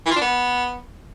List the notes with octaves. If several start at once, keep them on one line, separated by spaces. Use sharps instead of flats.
E3
F4
D4
B3